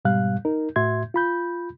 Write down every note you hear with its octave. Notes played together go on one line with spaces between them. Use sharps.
G#2 B2 G3 F5 F#6
D#4 A#4
A2 F#4 E5 C6 G#6
F4 B5 G6